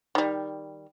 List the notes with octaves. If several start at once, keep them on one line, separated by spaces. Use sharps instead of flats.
D#3 G3